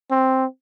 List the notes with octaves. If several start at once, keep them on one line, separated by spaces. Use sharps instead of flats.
C4